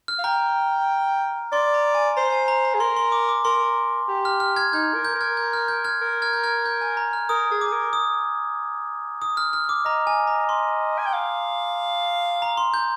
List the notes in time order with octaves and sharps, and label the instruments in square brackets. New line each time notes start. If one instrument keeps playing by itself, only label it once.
[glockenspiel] F6
[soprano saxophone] F5
[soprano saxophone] G5 [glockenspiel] A#5
[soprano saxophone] D5 [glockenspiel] C6
[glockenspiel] A#5
G#5
[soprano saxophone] C5 [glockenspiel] A#5
[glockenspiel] G#5
A#5
A#5
[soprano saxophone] G#4
[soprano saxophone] A#4 [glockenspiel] C6
[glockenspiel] C6
D6
D6
[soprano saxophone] A#4 [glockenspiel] C6
[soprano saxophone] G4
[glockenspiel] F6
F6
F6 G#6
[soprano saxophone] D#4 [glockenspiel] G6
[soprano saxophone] A#4
[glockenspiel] G6
[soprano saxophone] A#4
[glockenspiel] F6 G#6
G6
F6
G6
F6 G#6
[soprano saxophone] A#4
[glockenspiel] F6 G#6
G6
F6 G#6
G6
G#5
A#5
F6
[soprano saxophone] A#4 [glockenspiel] D#6
[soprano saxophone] G#4
[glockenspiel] D6
[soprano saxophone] A#4
[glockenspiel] D#6
D#6
F6
F6
D6
[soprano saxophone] D#5 [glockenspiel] A#5
[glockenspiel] G#5
A#5
C6
[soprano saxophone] G#5
G5
F5
[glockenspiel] A#5
C6
G6